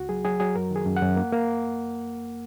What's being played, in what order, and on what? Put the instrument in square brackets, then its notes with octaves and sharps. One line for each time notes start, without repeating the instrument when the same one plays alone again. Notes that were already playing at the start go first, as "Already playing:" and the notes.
Already playing: [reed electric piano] C#2 F#4
F#3 G#4
F#3 G#4
F#3 G#4
F#2 A#4
D#3
G#4
F#2
F#5
F#2
A#3
A#3